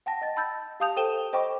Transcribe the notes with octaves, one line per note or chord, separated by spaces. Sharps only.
F#5 G5 A5 A#6
D#5 A6
A5 B5 E6 G6 A6
G4 F5 A5 D#6 G6 F7
A4 C5 G5 D#7 E7 G7
C5 D#5 G5 B5 C#6 D6